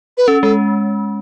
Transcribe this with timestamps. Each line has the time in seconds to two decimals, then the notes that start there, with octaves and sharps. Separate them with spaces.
0.18 B4
0.28 C#4 A4
0.42 G#3 A4